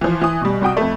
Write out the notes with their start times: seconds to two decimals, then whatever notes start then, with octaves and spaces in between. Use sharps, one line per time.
0.01 E3 F3
0.21 E3 D#6
0.41 B2 G3
0.62 C2 F#4 G5 D#6
0.77 F2 A3